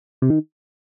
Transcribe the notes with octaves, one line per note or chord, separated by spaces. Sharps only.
C3
D#3